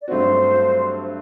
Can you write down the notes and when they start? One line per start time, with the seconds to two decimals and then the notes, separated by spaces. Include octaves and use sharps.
0.01 D5
0.08 G2 F#3 A3 C4 F#4 C5